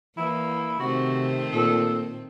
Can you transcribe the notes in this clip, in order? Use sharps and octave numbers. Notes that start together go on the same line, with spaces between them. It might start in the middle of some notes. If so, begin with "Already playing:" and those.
E3 A#3 E4
C3 D#3 A3 C4 F#4
A#2 A4